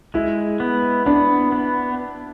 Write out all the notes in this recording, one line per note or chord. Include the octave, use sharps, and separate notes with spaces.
G#3 E4
B3
B3 D4
B3